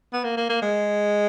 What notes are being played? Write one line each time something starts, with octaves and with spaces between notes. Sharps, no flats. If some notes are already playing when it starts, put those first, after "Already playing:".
B3
A#3
A#3
A#3
G#3